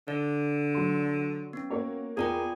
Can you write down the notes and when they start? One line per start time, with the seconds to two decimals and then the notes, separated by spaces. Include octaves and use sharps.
0.08 D3 D5
0.74 F#3 C6
1.53 B3 C#4
1.70 A#3 F#4 C#5
2.17 E2 F4 G#4 A#4 D5 G5 D#7